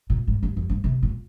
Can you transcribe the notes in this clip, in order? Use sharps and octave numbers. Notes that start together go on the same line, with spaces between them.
A#2
G#2
G2
F2
G2
C3
A#2